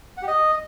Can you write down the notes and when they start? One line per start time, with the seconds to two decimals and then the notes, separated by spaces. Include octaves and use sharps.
0.17 F#5
0.22 G4
0.28 D#5